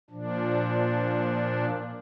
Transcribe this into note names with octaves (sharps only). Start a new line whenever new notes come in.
A#2 F3 D4